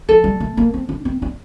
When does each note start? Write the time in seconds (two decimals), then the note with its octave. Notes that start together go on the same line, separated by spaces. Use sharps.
0.09 F3 A4
0.24 G3
0.40 A3
0.57 A#3
0.74 C4
0.89 D4
1.05 C4
1.22 D4